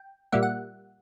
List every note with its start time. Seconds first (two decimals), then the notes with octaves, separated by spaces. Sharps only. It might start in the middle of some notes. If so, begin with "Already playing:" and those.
Already playing: G5
0.32 A#2 G3 A#3 E5 F#5
0.43 F#5